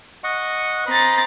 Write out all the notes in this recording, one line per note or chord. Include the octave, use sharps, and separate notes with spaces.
D#5 F#5 C#6
C4 D#5 A#5 B5 A6